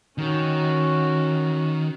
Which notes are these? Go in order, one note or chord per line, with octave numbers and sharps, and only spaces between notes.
D#3 C#4 F#4